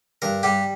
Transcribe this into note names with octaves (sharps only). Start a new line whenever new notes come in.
G2 A#4
G3 G4